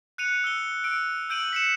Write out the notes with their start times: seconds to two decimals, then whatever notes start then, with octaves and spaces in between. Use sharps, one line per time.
0.18 F#6 C#7 D#7 F7
0.44 E6 G7
0.84 E6 D7
1.30 E6 G6 D7 D#7 F#7
1.53 B6 C#7 E7